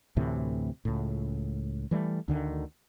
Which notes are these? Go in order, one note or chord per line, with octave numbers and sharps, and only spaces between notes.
D2 A2 C3 E3
C#2 A2
E3 G3 A3
D2 D3 D#3